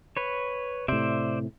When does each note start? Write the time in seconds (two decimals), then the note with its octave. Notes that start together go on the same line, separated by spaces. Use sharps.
0.17 B4 C#5
0.88 A2 C3 C5 D5 E5